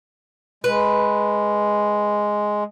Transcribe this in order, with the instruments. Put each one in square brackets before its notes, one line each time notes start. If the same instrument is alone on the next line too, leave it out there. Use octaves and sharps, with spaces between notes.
[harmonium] G#3 [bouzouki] B4